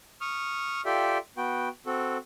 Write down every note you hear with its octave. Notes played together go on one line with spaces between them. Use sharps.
C#6 D#6 F6
F4 G4 A4 D5 E5 G5
B3 F#4 G5
C4 F#4 A4